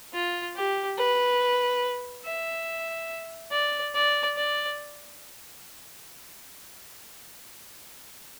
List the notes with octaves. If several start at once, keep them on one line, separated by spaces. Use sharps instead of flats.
F4
G4
B4
E5
D5
D5
D5